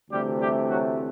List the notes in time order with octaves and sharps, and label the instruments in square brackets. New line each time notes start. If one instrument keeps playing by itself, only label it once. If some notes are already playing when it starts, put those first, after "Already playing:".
[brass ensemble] D2 C3 E3 G3 A3 G4
G3 G4
F#3 F#4